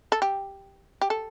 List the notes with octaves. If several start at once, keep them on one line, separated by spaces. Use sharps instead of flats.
A4
G4
G4
A4